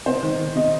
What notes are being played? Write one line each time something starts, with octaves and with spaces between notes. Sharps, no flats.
C3 C5
D#3
D#3
C3 D#5